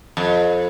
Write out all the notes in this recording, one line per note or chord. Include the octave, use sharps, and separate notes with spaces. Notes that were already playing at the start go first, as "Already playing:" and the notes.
F2